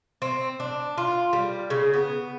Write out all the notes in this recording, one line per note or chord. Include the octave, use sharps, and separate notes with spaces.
C4
D4
F4
G3
C#3
B3